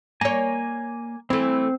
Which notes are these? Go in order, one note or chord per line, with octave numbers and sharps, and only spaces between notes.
A#3 C#5 G#5
E3 A3 C4